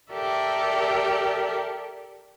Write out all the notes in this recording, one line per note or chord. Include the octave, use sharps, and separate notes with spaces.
G4 A4 A#4 D5 E5